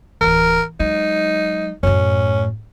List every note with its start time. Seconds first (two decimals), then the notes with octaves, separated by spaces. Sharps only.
0.21 D1 E3 A#4
0.80 F#3 G#3 D#4
1.83 F#2 A2 C#4